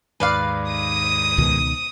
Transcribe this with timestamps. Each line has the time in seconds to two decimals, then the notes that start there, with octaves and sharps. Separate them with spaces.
0.20 D#2 G#2 B4 D5 F5
0.72 D#6 D#7
1.38 C#2 B2 D#3